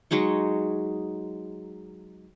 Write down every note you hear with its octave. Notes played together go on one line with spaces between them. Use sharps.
F#3 G#3 D#4 C#6